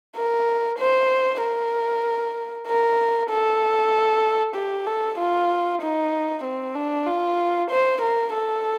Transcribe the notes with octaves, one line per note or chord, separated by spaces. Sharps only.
A#4
C5
A#4
A#4
A4
G4
A4
F4
D#4
C4
D4
F4
C5
A#4
A4